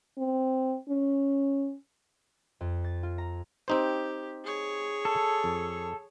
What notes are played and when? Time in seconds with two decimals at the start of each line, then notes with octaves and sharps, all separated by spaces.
0.18 C4
0.89 C#4
2.61 F2
2.84 A6
3.03 F4
3.18 A#5
3.68 C4 D#4 G4 C5
4.44 G#4 C#5
5.05 A4
5.44 F2